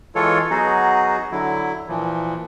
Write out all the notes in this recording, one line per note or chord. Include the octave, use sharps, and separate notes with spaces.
E3 G#3 F4 A4 C#5
F#3 B3 D#4 F#4 G#4
D3 F#3 E4
A#2 E3 F3